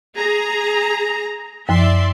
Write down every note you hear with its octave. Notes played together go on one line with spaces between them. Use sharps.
G#4 A#5
F#2 F3 D5 E5 C6